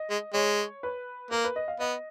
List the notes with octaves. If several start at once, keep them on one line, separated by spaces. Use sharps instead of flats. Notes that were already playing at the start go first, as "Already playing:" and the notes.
Already playing: D#5
G#3
G#3 C#5
B4
A#3 A#4
B4
D#5
F5
B3 D#5